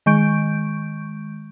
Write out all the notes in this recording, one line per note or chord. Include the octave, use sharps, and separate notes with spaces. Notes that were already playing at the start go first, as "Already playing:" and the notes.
D#3 G#3 C#6 G6 D7